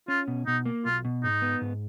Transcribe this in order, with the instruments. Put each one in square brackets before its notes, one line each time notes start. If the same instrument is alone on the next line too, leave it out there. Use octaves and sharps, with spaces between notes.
[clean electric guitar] C#4 [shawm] F4
[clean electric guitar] B2
[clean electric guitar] B2 [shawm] D#4
[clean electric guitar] A#3
[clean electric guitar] B1 [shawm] F4
[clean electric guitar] B2
[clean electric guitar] G#2 [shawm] D#4
[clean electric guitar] B3
G#2